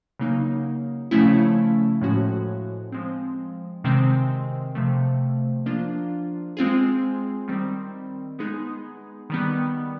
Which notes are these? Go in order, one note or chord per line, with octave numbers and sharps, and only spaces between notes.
C#3 F#3 A#3 D#4
C#3 F3 A3 C#4 E4
A2 F3 G#3 C#4 F#4
F3 G#3 C4
C3 D#3 G#3 C4
C3 F3 A3
F3 A#3 D4 F4
G#3 C4 F4 G#4
D#3 G3 C4
G#3 B3 D#4 G#4
D#3 G3 B3